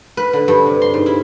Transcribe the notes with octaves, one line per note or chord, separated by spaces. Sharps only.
B4
D3
G2
C3
C6
G#2
E4